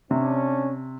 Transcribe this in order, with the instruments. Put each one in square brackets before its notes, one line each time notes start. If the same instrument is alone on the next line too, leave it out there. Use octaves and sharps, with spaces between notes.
[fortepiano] C3 [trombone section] C#4 D4